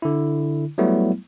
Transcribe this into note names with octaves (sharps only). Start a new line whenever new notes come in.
D3 E4
F#3 G3 A3 B3 E4